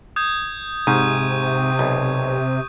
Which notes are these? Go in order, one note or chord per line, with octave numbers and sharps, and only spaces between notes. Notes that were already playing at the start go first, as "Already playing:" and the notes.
D#6 G6 G#6
G#2 C3 C#6 G6 D#7
B1